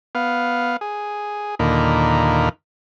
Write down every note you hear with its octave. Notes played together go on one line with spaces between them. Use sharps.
B3 F5
G#4
D#2 A#2 D3 D#4 A#4 B5